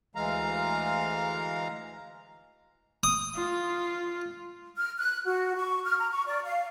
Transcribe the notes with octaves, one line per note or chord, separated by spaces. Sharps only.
D2 E3 G#3 F5 A#5
D#6
F4
F6
F#6
F#4
C#6
F6
A#5
C#6
D5
F5